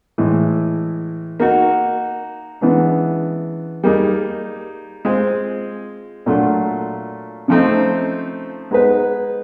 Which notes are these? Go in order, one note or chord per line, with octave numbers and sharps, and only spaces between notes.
A2 E3 G#3
A#3 D#4 F#4
C#3 E3 G#3 B3 D4
G3 A#3 D#4 G#4
G#3 C4 F4 G#4 C5
A#2 F#3 A3 D4 F4
C#3 F3 A3 C4 D#4
G#3 B3 D#4 G#4 B4